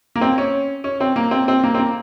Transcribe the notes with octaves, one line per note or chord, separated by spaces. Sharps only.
A#3
C4
C#4
C#4
C4
A#3
C4
C4
A#3
C4
A#3